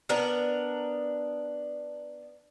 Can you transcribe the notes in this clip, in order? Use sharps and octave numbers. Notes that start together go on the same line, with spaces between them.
B3 D4 A#4